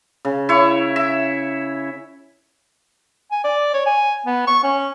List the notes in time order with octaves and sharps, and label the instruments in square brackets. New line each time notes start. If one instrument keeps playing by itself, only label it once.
[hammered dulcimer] C#3
E4 C#5
E5
[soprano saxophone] G#5
D5
C#5
G#5
B3
C#6
C#4